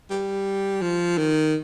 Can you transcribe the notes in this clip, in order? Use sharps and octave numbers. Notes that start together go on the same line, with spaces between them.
G3
F3
D#3